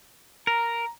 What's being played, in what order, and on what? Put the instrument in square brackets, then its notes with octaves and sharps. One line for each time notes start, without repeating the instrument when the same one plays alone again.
[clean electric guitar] A#4 [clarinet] A#5